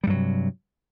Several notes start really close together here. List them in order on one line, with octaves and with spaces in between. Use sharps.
G3 G2 F#3 C3